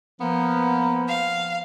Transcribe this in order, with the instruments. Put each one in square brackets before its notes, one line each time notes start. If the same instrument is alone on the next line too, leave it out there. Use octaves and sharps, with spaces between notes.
[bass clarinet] F3 [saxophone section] A#3 B3
[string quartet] F5